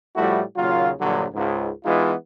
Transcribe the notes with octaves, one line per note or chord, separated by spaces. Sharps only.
A2 F3 G3 A3 E4 F#4
D#2 A#2 C#3 F#3 F4
A#1 G2 A#2 D3 F#3
C#2 G#2
E3 G#3 B3 D#4 F4